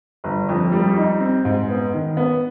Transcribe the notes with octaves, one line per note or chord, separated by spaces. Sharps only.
G1
F2
G3
D#4
C4
G#2
B3
D#3
B3